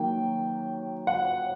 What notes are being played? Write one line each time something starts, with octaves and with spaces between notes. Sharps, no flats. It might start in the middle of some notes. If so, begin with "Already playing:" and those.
Already playing: D#3 F#3 A#3 G5
F#5